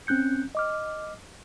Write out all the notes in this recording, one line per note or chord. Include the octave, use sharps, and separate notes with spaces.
C4 C#4 F#6 G6 C#7
D#5 D6 F6